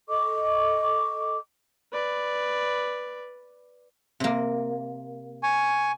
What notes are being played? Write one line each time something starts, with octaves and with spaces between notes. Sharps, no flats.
A4 D#5 C#6 D6
B4 D5
C3 A#3
G#5 C#6